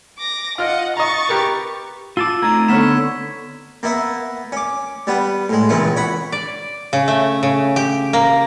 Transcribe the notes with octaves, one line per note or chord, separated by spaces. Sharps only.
D6 A#6
F4 D#5 F#5 F6
D#5 A#5 C#6 A6
G4 A#4 B4
F4 A5 D6 E6
A3 C4 D#4 A#5 G#6
D3 B3 C#5 F6 B6 E7
A#3 B3 E5
C#4 D6
G3 B3 B4
A2 G#3
C#2 A#2 E3 C#4 F4
C#5 F#5 B5
D5
C#3
A3
C#3
G4
A#3